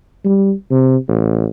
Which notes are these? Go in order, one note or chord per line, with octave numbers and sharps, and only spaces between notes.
G3
C3
A1